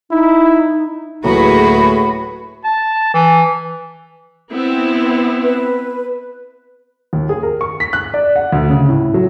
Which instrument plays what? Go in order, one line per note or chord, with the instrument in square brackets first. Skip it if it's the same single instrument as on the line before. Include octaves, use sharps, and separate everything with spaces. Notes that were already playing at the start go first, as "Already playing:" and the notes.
[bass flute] D#4 [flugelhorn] E4
[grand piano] D1 A#3 A#5 [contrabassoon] A2 [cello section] F#4 G#4 B4 [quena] B5
[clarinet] A5
E3
[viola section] B3 C4 E4
[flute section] B4
[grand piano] D#2
G#4
A#4
C#6
B6
F#6
D5
F#5
D2
C#3
A2
F#3